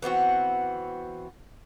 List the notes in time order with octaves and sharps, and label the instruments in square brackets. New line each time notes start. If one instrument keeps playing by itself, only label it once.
[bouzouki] E3 B3 C4 F#4